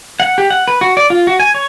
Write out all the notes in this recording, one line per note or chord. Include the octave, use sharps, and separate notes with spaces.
F#5
G4
F#5
B4
F#4
D5
F4
F#4
G#5
C#5